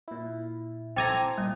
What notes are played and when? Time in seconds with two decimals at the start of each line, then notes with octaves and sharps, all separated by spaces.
0.08 A#2 E4
0.96 C4 A4 G5 G#5 A#5 D6
1.38 A#2 G3 D#5